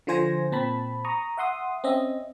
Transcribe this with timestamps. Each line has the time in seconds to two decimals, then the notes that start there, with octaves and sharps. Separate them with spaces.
0.07 D3 F3 F4 C5 G#5 A#6
0.52 A#2 C4 A5 B5
1.05 A#5 C#6 D#6
1.37 E5 F#5 C6 D#6
1.84 C4 C#4 D#5 E5